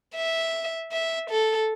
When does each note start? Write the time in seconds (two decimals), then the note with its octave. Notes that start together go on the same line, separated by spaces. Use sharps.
0.16 E5
0.92 E5
1.30 A4